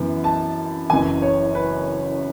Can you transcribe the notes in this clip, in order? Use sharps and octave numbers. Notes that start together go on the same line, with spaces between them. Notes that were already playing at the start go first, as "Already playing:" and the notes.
Already playing: F#2 E3 B3
A5
F#1 F#2 E3 G#5
C#5
B4